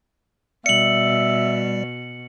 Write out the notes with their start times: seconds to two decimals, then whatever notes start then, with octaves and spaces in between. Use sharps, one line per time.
0.66 B2 G3 D5 E5 C#7 F#7